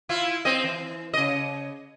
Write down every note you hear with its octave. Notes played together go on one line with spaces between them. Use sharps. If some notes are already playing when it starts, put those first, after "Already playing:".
E4 F4
C4 D#5
E3
C#3 D#5